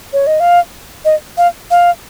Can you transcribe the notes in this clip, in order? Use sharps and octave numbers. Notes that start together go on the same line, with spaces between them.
C#5
D#5
F5
D#5
F5
F5